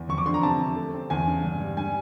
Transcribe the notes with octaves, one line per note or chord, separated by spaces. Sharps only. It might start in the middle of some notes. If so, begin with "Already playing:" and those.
Already playing: E2
F2 C#6
D6
D3 C6
A#5
C3 A5
C3
A3
C4
E2 G#5
C#3
G2
G3
G3 G#5